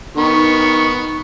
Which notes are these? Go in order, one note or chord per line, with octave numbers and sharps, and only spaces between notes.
D#3 B3 C#6